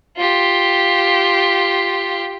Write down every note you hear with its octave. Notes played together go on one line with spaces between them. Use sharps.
F4 G4